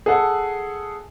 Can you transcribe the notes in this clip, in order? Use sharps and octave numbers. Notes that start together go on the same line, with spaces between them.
G#4 A4 F#5